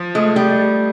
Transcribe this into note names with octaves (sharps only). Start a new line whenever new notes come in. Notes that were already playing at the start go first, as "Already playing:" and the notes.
Already playing: F3
G#3 A3
G3